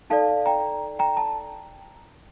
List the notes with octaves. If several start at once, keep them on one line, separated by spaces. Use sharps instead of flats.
D#4 A4 D5 F5 A5
G5 A#5
G5 A#5
A5